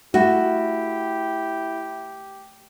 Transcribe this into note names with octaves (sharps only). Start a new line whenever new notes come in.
A3 E4 F#4 G4 E5 B5